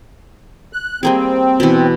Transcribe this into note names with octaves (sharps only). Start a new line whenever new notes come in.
F#6
G3 A#3 C4 G#4
B2 E3